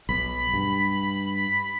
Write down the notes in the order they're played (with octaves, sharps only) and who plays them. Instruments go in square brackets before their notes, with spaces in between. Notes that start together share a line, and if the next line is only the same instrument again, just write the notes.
[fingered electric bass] B1 [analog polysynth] B5
[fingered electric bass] G2